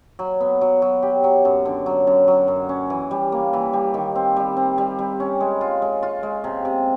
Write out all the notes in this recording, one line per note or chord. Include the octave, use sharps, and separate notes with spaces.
F#3
B3
F#3
F#3
G4
F#3
F#2
D3
F#3
F#2
F#3
F#2
C#4
E3
G3
A#3
E3
G3
D#3
C4
G3
C4
G3
G3
C#4
G#3
F4
G#3
F4
G#3
C3
C3